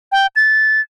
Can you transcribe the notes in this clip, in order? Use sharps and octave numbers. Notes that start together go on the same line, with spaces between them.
G5
A6